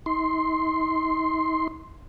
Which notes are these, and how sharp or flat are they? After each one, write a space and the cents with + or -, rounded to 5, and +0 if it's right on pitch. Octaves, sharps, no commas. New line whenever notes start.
D#4 +40 C6 +0